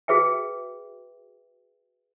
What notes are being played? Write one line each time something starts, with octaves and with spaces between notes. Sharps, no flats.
F#4 G#4 B4 E5 G5